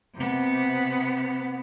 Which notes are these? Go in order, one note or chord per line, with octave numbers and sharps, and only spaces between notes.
C3 B3